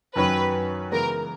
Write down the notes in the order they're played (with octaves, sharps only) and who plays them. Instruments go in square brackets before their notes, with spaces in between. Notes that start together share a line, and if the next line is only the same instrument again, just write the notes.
[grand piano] F#2 D#3 F#3 C#4 [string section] B4
[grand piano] C#3 E3 G#3 B3 [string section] A#4